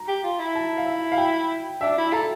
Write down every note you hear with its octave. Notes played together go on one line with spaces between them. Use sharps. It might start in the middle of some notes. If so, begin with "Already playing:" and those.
Already playing: A#5
G4
F4
E4
A5
F5
E5
F5
G5
D4 E5
E4
A4 A#5